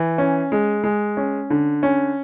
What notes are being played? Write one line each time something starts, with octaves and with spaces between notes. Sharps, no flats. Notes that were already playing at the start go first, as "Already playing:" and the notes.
Already playing: E3
C#4
G#3
G#3
C#4
D3
C#4